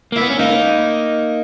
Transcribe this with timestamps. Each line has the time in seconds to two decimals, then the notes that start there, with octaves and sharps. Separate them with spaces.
0.12 A#3 E4
0.21 B3
0.30 C#4
0.39 A#3 D#4